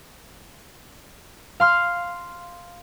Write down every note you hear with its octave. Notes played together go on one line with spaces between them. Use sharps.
F5 C6 F6